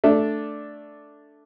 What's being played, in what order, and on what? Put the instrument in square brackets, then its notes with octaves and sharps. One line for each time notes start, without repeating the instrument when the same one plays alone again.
[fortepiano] A3 D4